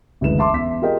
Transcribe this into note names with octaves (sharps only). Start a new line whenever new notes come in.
F#1 D2 E3 G#3 B4 E7
E5 A5 C6 D6
E2 E5 B6
F4 G4 G#4 A#4 D#5 G5